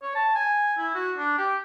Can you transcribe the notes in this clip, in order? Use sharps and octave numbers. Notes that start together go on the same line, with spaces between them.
C#5
A5
G#5
E4
F#4
D4
G4